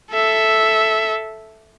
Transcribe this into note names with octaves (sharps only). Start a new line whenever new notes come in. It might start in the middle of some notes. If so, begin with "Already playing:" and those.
A4 E5